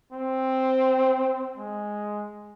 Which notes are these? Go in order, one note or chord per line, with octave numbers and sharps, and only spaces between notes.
C4
G#3